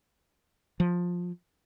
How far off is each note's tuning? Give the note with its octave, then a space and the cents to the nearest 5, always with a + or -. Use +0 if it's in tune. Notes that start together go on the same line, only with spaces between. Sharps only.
F3 +15